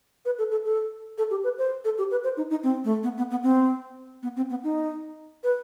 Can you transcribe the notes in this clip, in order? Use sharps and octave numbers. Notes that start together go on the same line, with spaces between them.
B4
A4
A4
A4
A4
G4
B4
C5
A4
G4
B4
C5
D#4
D#4
C4
A3
B3
B3
B3
C4
B3
C4
B3
D#4
B4